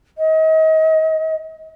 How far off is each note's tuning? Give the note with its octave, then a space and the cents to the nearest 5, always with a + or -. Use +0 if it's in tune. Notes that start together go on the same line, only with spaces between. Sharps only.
D#5 +35